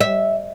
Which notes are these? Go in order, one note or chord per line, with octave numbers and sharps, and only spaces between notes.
E5